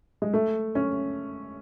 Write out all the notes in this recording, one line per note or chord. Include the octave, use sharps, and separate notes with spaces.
G#3
A3
C#4